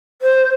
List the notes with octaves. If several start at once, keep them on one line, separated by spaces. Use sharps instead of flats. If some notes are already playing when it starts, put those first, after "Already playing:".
C5